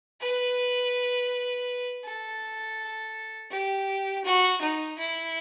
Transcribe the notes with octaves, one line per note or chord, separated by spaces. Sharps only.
B4
A4
G4
F#4
D#4
E4